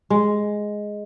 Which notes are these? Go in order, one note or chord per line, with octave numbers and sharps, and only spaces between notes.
G#3